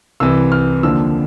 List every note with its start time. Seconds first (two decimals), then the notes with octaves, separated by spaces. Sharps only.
0.20 C2 C3 E3 E6
0.52 F6
0.83 D#2 D3 F3 E6